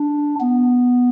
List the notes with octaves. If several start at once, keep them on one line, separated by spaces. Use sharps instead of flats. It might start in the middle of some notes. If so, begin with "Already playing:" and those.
Already playing: D4
B3